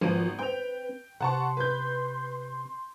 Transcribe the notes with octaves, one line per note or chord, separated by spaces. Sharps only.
G#1 F3 B3 D#7
C4 B4 G5 F7
C3 F#5 A5 C6 C#6
B4 G6